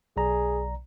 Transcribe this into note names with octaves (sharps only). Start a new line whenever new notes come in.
B1 G#4 D5 A#5